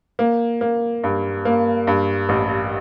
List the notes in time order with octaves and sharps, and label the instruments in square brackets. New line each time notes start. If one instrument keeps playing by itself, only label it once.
[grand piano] A#3
A#3
G2
A#3
G2
A1